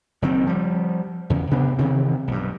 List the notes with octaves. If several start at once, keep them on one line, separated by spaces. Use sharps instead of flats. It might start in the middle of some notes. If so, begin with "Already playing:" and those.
F#1 D#3 C4
F3 G3
E2 C#3
C3 B3 D4
C3 D#3 E3 C4
B1 G2